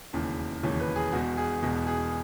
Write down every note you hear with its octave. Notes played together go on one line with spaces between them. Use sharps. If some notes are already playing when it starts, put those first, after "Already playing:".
E1 D#2 C#3 E3
E1 D#2 C#3 E3 C#5
B4
G#4
E1 E2 B2 F#4
G#4
E1 E2 B2
G#4